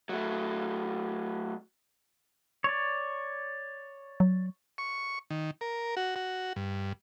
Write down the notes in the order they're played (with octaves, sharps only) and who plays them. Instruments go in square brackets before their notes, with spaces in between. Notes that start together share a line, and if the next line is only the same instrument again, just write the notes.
[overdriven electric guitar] F#3 A3
[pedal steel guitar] C#5 D5
[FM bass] F#3
[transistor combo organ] C#6
D#3
A#4
F#4
F#4
G2